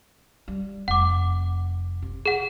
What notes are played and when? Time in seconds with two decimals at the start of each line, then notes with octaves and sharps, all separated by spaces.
0.48 G3
0.88 F1 F#5 D6
2.02 C3
2.26 G#4 F#5